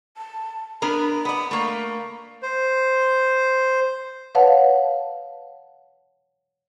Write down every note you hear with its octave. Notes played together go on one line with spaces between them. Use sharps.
A5
B3 D4 A#4 B5
B3 D5
A3 A#3 C#6
C5
B4 C#5 F5 F#5 A5